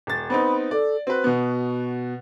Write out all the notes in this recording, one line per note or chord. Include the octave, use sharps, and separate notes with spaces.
D#1 A6
B3 C4 D#4 B5
A4 D5
C4 F#4 B4
B2 B3